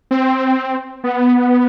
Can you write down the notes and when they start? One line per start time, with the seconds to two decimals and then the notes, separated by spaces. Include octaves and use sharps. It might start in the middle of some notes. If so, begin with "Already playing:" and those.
0.11 C4
1.04 B3